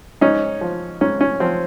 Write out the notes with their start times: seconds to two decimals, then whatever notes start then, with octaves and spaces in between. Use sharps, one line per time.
0.21 G#2 C#4 D#4
0.61 F3
1.01 G#2 C#4
1.21 C#4
1.40 F3 C4